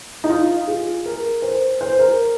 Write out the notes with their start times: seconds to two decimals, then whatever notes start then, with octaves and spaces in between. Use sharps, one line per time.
0.24 D#4
0.30 F4
0.67 G#4
1.06 A#4
1.42 C5
1.81 C5
1.99 A#4